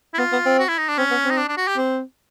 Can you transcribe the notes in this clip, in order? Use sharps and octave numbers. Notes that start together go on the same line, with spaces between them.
E4
B3 F4
B3
C4
F#4
E4
D#4
D4
C4 C#4
B3
C4
D#4
D4
D4
F#4
G4
C4